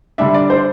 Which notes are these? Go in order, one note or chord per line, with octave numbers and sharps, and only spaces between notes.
D3 G3 D4 E5
D5
C5